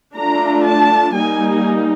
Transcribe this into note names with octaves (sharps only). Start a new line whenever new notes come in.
A3 D4 F4 A#5
A5
G3 A#3 D#4 G#5